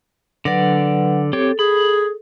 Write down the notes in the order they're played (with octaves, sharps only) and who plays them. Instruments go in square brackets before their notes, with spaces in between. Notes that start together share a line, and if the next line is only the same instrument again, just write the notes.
[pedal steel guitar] D3 D5 [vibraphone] F#3 B4 F#5
[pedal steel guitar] C4 G4 C#5 [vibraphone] A4
[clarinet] G#4 [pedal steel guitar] B5